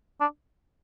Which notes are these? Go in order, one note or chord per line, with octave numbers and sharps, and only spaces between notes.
D4